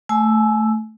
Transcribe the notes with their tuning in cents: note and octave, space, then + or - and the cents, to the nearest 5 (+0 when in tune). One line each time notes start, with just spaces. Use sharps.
A3 +0 G#5 +30 E6 +0